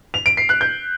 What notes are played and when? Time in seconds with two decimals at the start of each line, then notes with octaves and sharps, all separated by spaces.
0.14 F7
0.26 D7
0.37 C7
0.49 F#6
0.61 G6